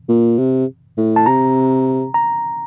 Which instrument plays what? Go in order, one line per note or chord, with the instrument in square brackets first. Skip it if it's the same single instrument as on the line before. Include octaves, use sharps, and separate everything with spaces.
[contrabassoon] A#2
C3
A2
[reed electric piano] A5
[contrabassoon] C3 [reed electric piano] A#5
[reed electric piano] A#5